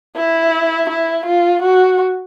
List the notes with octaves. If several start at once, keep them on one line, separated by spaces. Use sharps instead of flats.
E4
E4
F4
F#4